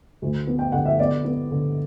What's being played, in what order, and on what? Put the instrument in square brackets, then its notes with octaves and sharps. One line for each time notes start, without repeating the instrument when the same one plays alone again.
[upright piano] D2
B3
G5
D3 F#5
E5
B3 D5
B3
D3